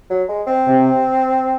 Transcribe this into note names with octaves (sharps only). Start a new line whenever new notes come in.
F#3
G#3
C4
C3